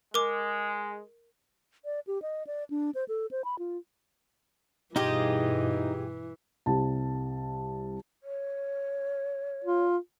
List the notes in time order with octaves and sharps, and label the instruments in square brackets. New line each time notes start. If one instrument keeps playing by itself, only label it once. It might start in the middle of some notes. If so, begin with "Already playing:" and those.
[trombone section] G#3 [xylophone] A#4 D6
[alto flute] D5
G4
D#5
D5
D4
C5
A4
C5
B5
F4
[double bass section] G2 B2 [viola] E3 [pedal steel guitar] D#4 D#5 [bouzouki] F4 G4 G#4
[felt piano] C2 G3 A5
[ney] C#5
[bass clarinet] F4